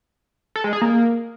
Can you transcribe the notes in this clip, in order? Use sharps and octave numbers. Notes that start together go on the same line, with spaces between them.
A4
G#3
G#4
A#3